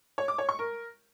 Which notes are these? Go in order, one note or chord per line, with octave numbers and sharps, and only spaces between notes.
C#5
D6
C#5
C#6
A#4